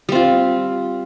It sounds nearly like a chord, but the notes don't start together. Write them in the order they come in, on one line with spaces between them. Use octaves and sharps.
G3 C4 F4